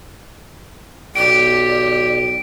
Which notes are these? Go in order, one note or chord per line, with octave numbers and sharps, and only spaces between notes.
B1 G4 D5 D7